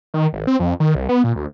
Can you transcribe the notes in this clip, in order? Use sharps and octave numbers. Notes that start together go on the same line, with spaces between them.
D#3
G#1
C4
F2
D#3
C2
B3
A#2
D2